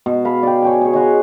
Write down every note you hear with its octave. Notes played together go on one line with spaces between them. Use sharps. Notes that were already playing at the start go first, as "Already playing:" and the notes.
B2
F5 A5 B5
D5 G5
C#5 G5 G#5
G#4 C#5
C#5 D#5 F#5 C6